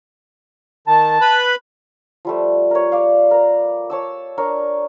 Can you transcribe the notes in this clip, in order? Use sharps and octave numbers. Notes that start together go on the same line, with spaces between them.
D#3 A5
B4 B5
F3 G3 A3
A#4 C#5
D5 F5
A#4 A#5
C#5 A5 E6
D4 A#4 C#5